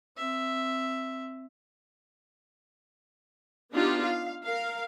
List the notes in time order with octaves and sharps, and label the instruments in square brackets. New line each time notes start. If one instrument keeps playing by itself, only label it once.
[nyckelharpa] C4 E5
[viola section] B3 D4 D#4 F4 G4
F5
A#4 F5